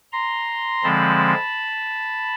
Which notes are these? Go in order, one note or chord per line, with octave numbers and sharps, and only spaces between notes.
A#5 C6
D3 F3 G#3 C4 A5 B5